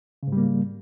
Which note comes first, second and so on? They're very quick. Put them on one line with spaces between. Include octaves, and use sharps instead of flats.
C#3 G#2 G3 A#3